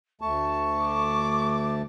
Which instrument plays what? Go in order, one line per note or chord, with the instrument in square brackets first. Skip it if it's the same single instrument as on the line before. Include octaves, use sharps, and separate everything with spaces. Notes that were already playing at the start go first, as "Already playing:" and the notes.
[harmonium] D2 A3 A5 [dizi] C#6
[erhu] D6